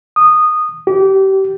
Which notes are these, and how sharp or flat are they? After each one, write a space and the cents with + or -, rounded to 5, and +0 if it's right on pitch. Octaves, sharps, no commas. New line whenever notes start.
D#6 -15
G4 -30